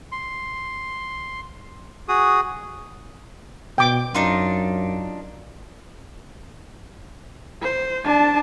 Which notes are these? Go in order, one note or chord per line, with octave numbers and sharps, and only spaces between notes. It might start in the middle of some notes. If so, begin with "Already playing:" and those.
C6
F#4 G#4 D#6
B2 G5 D6
F#2 D4 D#4 F4
C5
D4 A5